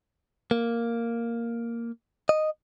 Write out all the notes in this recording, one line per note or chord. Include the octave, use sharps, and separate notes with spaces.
A#3
D#5